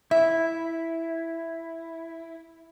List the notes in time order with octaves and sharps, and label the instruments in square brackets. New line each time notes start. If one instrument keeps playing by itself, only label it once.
[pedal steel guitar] E4 [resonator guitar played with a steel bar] E5